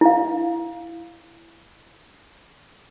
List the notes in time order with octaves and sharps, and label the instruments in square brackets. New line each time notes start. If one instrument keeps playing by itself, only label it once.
[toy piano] E4 F5